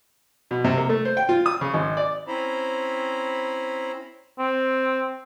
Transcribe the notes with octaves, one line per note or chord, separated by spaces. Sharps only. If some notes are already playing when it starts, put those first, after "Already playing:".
B2
C3
A#3
A3
C5
G5
F4
D#6
C#3
G#1
D5
C4 C#4 E4 C5 A#5 B5
C4